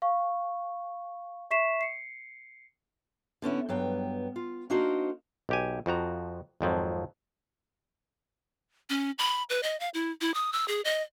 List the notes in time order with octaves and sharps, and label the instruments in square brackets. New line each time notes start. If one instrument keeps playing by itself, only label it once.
[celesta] F5 C#6
E5 C#6 B6 C7 E7
C7 C#7
[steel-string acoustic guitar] D3 B3 C#4 E4
G2 F#3 B3 G5
F4
A#3 D4 D#4 F#4 A#4 C5
[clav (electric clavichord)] B1 G4 G#5
F2 F3 F#4 A#5
G#1 F2 F3 F#3
[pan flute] C#4
B5
B4
D#5
F5
E4
E4
D#6
E6
G#4
D#5